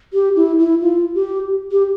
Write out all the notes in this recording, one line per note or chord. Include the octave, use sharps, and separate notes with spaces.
G4
E4
E4
F4
G4
G4